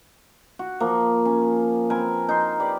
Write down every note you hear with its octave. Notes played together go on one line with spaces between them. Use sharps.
F#4
F3 A#3
C#4
C4 A#4 B4 G#5
D#4 C6
G4 B4 D5